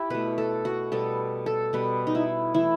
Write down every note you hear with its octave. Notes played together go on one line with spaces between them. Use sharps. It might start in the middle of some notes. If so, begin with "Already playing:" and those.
Already playing: E4 G4
B2 A3 B4
A4
F#4
B2 G3 B3 A4
A4
B2 G3 B3 B4
D#4
E4
E3 A3 E4